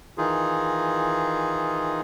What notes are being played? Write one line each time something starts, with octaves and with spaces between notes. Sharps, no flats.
D#3 E3 D#4 F4 G#4